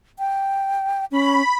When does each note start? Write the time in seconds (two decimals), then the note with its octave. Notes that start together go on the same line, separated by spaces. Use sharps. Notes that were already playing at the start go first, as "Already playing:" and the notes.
0.19 G5
1.12 C#4 B5